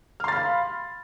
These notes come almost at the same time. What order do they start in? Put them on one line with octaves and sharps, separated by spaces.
F6 C6 A6 B5 F5